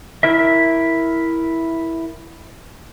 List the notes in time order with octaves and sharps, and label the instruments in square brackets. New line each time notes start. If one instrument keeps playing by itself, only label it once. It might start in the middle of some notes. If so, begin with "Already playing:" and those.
[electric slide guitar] E4 A#4 E5